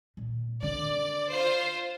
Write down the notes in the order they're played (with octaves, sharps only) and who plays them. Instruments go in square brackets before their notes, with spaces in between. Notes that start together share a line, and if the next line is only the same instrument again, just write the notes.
[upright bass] A#2
[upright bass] D3 [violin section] D5
[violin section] F4 C5